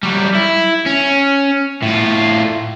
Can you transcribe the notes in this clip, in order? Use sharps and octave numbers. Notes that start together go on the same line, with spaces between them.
F#3 G3
E4
C#4
A2 F4